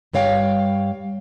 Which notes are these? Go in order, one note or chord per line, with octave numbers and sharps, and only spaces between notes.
G2 G3 C#5 F5 G5